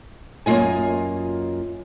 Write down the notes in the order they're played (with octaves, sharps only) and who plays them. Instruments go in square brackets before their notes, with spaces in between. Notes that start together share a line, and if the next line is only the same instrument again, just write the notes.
[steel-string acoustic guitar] F#2 A#3 F4 D#5 G#5